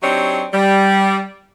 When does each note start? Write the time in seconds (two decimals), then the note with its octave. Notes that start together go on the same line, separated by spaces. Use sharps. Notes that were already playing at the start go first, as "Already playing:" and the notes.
0.01 F#3 C4 D4 D#4 G4 C#5
0.52 G3